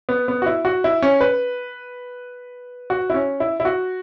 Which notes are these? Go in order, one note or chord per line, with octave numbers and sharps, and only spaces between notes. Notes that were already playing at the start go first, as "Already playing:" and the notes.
B3
B3
F#4
E4
F#4
E4
C#4
B4
F#4
E4
C#4
E4
E4
F#4